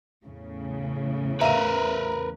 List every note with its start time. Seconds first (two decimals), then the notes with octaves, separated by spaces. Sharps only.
0.25 E2 A2 C#3
1.41 A#4 B4 E5 F5 A#5 D#7